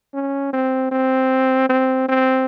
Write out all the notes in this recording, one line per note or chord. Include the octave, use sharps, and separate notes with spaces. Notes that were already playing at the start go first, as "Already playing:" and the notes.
C#4
C4
C4
C4
C4